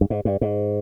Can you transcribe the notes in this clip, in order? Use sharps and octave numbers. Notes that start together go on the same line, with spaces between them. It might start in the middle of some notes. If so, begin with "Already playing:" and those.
G2
G#2
G2
G#2